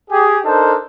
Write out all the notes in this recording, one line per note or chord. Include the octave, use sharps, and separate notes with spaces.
G4 G#4
D4 D#4 A4 A#4 C5